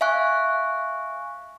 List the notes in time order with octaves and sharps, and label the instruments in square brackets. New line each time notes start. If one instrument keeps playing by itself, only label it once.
[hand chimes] E5 F5 G#5 C#6 F#6